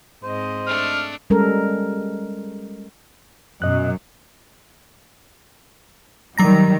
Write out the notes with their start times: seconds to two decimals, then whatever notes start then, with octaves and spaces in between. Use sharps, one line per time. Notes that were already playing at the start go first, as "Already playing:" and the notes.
0.23 G#2 C4 C5 D#5
0.66 A3 D4 F6
1.30 G3 G#3 C#4 A4 A#4
3.62 F#2 B2 D#5 F#6
6.38 D#3 F#3 G3 A#5 A#6